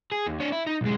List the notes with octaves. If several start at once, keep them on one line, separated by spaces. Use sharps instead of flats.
G#4
D#2
D4 C#5
E4
D#4
B1 G#3